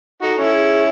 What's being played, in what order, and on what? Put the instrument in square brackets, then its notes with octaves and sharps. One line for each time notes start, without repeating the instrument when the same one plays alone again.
[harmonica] D#4 F#4 [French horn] A4
[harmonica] C#4 E4
[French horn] G#4